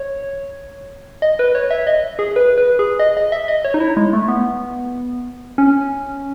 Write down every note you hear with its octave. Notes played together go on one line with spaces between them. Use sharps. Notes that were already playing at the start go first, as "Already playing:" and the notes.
Already playing: C#5
D#5
B4
C#5
E5
D#5
G#4
B4
B4
G#4
D#5
D#5
E5
D#5
C#5
D#4
E4
G#3
A3
B3
C#4